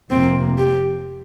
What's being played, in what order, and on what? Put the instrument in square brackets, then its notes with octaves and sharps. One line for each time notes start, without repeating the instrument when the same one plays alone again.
[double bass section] F1 F2 C3 A#3 [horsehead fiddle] C4
[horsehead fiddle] G4